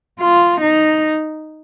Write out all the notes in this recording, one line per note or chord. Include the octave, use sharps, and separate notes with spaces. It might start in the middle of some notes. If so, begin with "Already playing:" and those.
F4
D#4